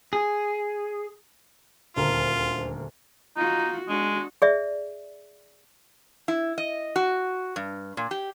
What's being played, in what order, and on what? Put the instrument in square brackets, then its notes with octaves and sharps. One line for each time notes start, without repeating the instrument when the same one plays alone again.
[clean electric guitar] G#4
[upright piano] D#1 D2 A#4 [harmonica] F4
[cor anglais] D#4 [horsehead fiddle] F4 F#4
[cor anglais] G#3 [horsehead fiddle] D4 F#4
[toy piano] G#4 D5 E5
[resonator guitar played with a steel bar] E4
D#5
F#4
G2
A#2
G4